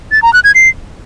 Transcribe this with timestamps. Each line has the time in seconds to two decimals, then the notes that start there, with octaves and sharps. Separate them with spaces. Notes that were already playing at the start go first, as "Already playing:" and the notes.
0.12 A6
0.22 A#5
0.33 F#6
0.44 G#6
0.55 C7